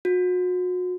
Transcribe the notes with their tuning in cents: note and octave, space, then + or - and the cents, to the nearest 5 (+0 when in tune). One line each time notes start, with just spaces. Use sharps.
F#4 -35